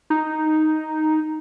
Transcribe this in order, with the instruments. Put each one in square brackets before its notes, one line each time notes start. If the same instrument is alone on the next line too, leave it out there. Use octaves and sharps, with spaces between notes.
[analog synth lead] D#4